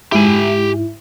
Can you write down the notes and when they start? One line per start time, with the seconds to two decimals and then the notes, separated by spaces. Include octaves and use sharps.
0.12 G#2 E4 G4 G#5